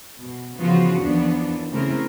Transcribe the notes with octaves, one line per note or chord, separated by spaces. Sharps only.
B2
C#3 E3 F3 B3 F4 F#4
D#2 E3 F3 B3 D4
C#3 A3 C4 E4 A#4